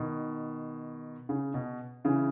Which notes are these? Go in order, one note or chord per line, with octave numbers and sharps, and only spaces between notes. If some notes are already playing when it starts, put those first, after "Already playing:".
Already playing: B2 D#3
C#3
B2
C#3 E3